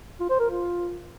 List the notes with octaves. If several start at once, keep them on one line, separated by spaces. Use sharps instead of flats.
F4
C5
A#4
F4